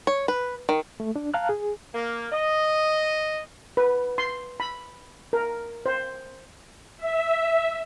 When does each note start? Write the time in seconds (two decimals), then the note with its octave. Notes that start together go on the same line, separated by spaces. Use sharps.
0.07 C#5
0.28 B4
0.69 D#3
1.00 A3
1.16 D4
1.34 F5 A5 A#5 F6 F#6
1.49 G#4
1.95 A#3
2.33 D#5
3.77 B4
4.18 C6
4.60 B5
5.33 A#4
5.86 C5
6.97 E5